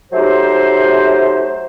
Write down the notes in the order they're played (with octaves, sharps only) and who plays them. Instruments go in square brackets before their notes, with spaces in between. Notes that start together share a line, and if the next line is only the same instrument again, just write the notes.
[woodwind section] F#3 A3 D#4 G4 C5